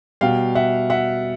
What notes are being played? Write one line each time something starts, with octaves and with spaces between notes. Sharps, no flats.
B2 G3 F5 G5
E5 F#5
E5 F#5